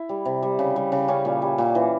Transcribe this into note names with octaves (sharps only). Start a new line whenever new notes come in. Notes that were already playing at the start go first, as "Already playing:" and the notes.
Already playing: E4
G3
C3
G3
C#3
G3
C#3
G3 C#4
A#2
G3
A#2
E3